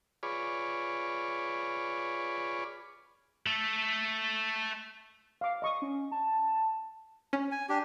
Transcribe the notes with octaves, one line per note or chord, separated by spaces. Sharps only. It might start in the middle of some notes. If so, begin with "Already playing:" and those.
F4 G#4 B4 C#5 D5
A3 A4
F5 D6
D#5 C#6 D#6
C#4
A5
C#4
G#5
D4 G4